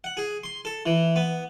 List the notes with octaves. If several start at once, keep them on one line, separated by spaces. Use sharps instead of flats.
F#5
G#4
C6
A4
E3
B3